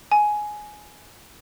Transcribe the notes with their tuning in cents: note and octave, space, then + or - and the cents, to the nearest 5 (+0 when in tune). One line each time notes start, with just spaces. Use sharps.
G#5 +10